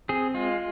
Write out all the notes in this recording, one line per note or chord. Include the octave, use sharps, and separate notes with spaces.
C4 G#4
G#3 F4